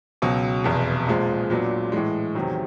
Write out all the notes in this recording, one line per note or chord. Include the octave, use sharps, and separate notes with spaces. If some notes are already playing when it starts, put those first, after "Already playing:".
C#2 B2 F#3
F1 E2 B2
B1 A#2 F3 G#3
A#2 F#3 B3 D4
A2 E3 G#3
E2 C3 D#3 F#3